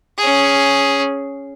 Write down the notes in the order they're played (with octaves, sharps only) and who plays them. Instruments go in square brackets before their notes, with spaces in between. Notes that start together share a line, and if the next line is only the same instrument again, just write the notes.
[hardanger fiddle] C#4 G#4